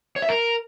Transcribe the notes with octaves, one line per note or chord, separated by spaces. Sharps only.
C#5
E5
A#4